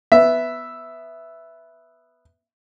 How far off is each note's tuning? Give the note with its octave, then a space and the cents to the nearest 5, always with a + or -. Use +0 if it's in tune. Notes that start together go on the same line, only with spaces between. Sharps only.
B3 +0 E5 +0